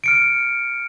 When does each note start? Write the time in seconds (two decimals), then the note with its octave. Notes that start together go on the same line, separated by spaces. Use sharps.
0.04 F6 C#7 D7